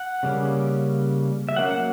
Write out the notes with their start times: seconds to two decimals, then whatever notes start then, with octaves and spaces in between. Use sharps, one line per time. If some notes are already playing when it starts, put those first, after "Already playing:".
Already playing: F#5
0.23 C#3 G3 A#3 C#4
1.49 E5
1.56 F#3 A#3 C#4 F#5
1.71 F#5